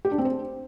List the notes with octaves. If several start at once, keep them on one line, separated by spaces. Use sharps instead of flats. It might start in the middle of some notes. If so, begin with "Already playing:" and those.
G4
D4
C4
C5